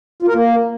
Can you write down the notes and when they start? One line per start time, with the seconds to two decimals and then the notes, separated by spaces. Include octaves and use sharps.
0.22 F4
0.28 A#4
0.34 A#3